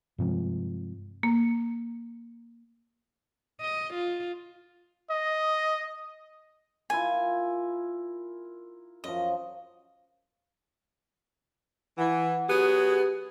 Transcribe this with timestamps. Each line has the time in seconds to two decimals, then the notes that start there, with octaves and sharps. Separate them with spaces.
0.18 G2 C3 F3 G#3
1.23 A#3
3.61 D#5
3.93 F4
5.10 D#5
6.90 E4 F4 A#4 G#5
9.04 F#2 F3 D#5
11.98 E3 F#5
12.48 F#3 B3 G4 G#4